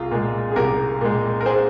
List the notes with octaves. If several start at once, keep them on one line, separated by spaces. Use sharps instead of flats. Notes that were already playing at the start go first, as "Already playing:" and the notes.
Already playing: C2 F4 G#4
A#2 G#3
G#4
C2 G4 A#4
A#2 G#3
A#4
G#4 C5